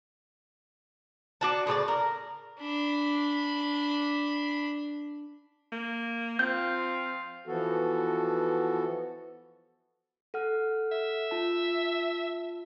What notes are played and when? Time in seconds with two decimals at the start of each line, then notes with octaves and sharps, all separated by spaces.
1.41 D4 F#4 A5
1.67 A2 C#3 G#4 D5
1.88 A#4
2.60 D4 B5
5.72 A#3
6.39 F3 C4 F4 F5 G6
7.46 E3 F3 B3 F#4 A4
10.34 A4 F#5 F6
10.92 E5
11.31 F4 A5